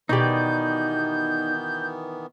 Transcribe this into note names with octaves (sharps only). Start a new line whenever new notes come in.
B2 D#3 E3 B3 D#4 G4 D5 G6